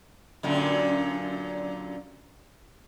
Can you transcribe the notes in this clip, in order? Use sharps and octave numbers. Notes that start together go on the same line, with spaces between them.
F#2 A#2 D3